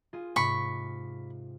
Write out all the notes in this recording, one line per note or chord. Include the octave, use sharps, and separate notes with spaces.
F4 G#4
G#2 C3 B5 C#6